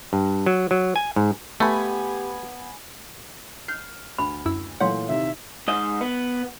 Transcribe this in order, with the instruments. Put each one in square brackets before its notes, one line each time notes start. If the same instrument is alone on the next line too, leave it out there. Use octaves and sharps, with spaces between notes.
[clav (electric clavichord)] G2
F#3
F#3
G#5
G#2
[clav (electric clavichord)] A3 [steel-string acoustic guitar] B3 [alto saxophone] G4 [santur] G#5 B5
[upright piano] F6 [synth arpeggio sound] G6 C7
[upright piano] D2 [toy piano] B5
[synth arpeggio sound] F#2 E4 E6
[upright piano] A#2 E3 A3 [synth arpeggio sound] F#3 F#5 [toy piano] C#5 F5 C6
[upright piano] C3 D#3 E4 [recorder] E5
[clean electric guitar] G#2 D#5
B3